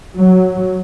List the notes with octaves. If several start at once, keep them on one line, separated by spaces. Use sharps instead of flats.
F#3